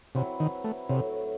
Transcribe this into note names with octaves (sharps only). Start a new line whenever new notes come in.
C3 F#3 C4 E4 B4
D#3
A3
A2 C3 F#3 A3